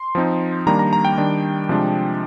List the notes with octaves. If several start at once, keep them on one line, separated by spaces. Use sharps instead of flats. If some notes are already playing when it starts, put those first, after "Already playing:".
Already playing: C6
F3 C4 D#4
D#3 G3 A#3 D4 A#5
A#5
A#5
G5
D#3 G3 D4
C3 F3 G#3 D4